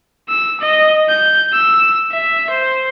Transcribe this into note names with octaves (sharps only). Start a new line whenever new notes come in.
E6
D#5
G6
E6
E5
C5